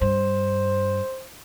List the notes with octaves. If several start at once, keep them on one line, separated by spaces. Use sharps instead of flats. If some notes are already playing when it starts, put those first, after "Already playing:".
G2 C5